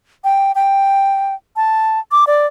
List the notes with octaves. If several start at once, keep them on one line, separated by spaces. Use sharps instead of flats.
G5
G5
A5
D6
D5